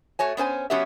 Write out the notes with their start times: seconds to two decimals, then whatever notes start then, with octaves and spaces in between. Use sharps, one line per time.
0.19 A3 F#4 C#5 G#5
0.37 B3 C#4 C5 G#5
0.70 F#3 B3 C#4 F#4 G4 E5